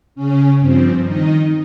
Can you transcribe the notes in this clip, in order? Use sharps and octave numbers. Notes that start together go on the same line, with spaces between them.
C#3 C#4
G2 F3 C4
D#3 D#4